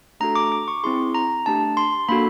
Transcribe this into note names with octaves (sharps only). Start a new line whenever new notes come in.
A3 D4 F#4 A4 A#5
D6
D6
C#6
C4 E4 G#4 C6
A#5
A3 D4 G4 A5
C6
A#3 D4 F#4 A4 B5